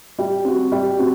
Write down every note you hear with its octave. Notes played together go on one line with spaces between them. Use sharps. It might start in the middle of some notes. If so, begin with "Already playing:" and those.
G3
C4 F#4
G3
C4 F#4